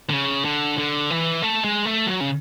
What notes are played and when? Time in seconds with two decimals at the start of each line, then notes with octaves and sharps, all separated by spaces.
0.10 D3
0.13 C#3
0.45 D3
0.78 D3
1.10 E3
1.42 A3
1.65 G#3
1.85 A3
2.07 F#3
2.21 C#3